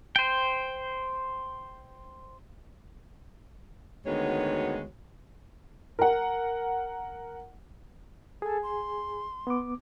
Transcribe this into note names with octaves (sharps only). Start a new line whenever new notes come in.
C5 G5
D2 D#3 G#3 B3 F#4 C#5
A#4 F#5
G#4 A4 G#5
C6
B3 D6